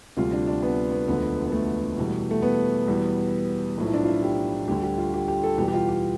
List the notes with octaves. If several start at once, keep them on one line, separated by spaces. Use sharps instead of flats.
D2 C3 G3 F4
D4
D4
B3
B3
E1 D2 D3 F3 B3
B3
A3
E2 B2 G3
A3
B3
E2 B2 G3
B1 A2 F3
E4
D4
F4
E4
G4
D2 D3 G3 G4
G4
F4
G4
G4
A4
E2 B2 G3 G4
G4
F4
G4